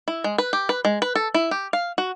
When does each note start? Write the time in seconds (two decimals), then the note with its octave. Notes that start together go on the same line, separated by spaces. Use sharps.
0.08 E4
0.24 G#3
0.38 B4
0.53 G4
0.69 B4
0.85 G#3
1.02 B4
1.15 A4
1.34 E4
1.51 G4
1.73 F5
1.98 F#4